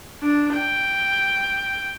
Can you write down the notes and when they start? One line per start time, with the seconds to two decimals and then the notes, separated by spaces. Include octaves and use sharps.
0.22 D4
0.55 G5